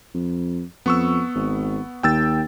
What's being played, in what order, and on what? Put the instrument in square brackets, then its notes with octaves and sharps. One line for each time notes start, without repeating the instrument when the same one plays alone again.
[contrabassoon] F2
[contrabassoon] F2 [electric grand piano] B3 C#6 E6
[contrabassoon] G#1
[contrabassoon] D#2 [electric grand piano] G5 E6 A6